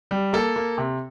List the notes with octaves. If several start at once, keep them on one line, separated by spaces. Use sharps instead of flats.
G3
A#3 A4
A#3
C3